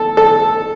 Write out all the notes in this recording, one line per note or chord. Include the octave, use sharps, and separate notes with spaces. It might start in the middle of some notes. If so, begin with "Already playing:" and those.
Already playing: A4
A4